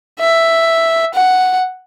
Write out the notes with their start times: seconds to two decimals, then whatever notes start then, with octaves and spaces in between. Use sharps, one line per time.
0.20 E5
1.14 F#5